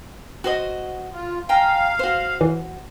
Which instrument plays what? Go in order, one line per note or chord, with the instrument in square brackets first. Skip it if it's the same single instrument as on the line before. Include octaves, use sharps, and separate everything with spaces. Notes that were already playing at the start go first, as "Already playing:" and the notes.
[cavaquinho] F#4 C5 D#5
[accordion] F4
[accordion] F5 [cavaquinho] G5 G#5 A#5
[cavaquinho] F#4 C5
[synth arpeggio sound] E3